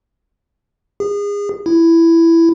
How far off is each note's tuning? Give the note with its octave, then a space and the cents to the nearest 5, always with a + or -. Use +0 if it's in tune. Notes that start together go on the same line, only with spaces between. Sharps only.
G#4 -30
E4 +10